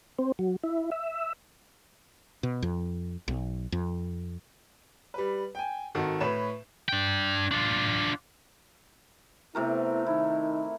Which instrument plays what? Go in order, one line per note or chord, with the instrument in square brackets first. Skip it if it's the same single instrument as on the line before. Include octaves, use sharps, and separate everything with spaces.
[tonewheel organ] C4
F#3
E4
E5
[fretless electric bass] B2
F2
B1
F2
[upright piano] G3 B4
G5 G#5
G#1 D#3 F#4 A4
A2 B4 C#5 E7
[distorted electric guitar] D4 G5
D4 F4
[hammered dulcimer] C3 A3 A#4 [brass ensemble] B3 E4
[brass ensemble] D#3 D#4 [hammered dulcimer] E4